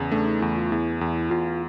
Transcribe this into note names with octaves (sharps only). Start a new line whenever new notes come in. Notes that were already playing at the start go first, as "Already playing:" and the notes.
Already playing: E2 C#3
A3 D4
D#4
E2 E4
F4
E2 E4
E2
E2 F4